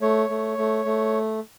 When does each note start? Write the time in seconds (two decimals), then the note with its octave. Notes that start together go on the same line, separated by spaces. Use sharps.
0.01 A3 C#5
0.29 A3
0.58 A3
0.85 A3